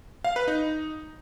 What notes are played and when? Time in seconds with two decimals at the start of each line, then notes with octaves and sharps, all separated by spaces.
0.24 F5
0.36 B4
0.48 D#4